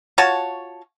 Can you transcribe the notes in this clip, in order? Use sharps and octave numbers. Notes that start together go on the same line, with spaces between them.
F4 F#4 C#5 A5